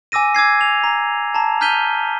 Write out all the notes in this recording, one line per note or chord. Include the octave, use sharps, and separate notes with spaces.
G#5 D6 E6 A#6 D#7
D6 E6 G#6 C7
F7
A#5
A5 A#5
A#5 F6 G6 B6 D#7 G7